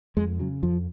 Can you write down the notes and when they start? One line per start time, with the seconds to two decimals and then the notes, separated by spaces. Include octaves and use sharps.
0.17 F2 G#3
0.39 C#3 F#3
0.63 F2 F3